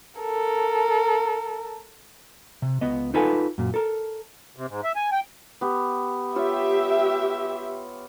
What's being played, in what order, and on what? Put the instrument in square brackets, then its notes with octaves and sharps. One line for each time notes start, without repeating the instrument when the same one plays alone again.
[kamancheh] A4 A#4
[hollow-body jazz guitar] C3
C#2 B3 D#5
D#4 F4 A4 B4 F#5 G#5
F#2 A#2
A4 A#4
[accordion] C3
G#2
E5
G#5
G5
[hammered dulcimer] B3 G4
[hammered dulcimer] F4 C#5 [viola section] G4 E5